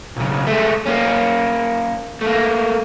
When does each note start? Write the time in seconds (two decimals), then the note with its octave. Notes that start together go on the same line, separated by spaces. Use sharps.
0.17 B1 C#3
0.47 G#3 A3
0.86 A#3 C#4
2.21 A3 A#3